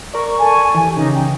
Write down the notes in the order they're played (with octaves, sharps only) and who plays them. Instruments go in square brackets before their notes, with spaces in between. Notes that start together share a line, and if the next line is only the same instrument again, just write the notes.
[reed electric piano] A#4 D5 [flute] C#6
[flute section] A4 G#5 A5
[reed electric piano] E3 [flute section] G4 [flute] G#5
[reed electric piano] C#3 E3 C#4 [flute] D#4
[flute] G5